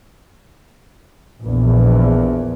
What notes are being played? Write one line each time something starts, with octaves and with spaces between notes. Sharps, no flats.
A#1 E2